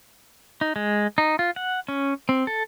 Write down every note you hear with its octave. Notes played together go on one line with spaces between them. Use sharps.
D#4
G#3
D#4
F4
F#5
C#4
C4
A4